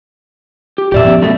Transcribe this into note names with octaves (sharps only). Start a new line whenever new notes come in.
G4
A1 F2 A2 G4 D5 E5
F3 B3 C#4
F#2 B2 A3